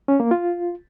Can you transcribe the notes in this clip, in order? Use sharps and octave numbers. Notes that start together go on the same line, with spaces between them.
C#4
A#3
F4